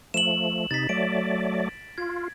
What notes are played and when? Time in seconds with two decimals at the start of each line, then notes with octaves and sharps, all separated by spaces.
0.14 F3 A3 E7 F#7
0.71 C3 D#4 A6 B6
0.89 F#3 A3 D5 D7
1.98 F4 G#6